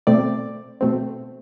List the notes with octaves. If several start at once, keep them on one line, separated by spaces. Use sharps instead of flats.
B2 A3 C4 D5
B2 A3 C4